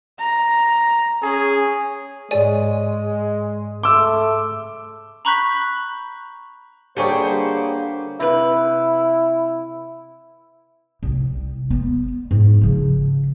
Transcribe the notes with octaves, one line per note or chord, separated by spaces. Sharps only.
A#5
C#4 G#4
G#2 G#3 G#4 C#5 D5 G#5
A3 C6 D6 E6
A#5 B5 C#6 F#6 G6 B6
D3 G3 A#3 G4 G#4 C5 C#5
C3 E4 B4
C2
B3
G#2
C#3 F3